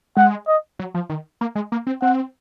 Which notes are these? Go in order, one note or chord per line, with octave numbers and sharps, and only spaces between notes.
G#3 F#5
D#5
F#3
F3
D#3
A#3
G#3
A#3
C4
C4 F#5